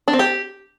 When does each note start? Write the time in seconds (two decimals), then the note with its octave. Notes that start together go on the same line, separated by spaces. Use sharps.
0.08 D4
0.13 C4
0.19 G4